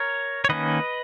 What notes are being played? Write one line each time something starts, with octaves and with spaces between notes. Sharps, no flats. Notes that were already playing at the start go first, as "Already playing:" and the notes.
Already playing: A#4 C#5
C#5
D#3 A#3 C#4 B4 D#5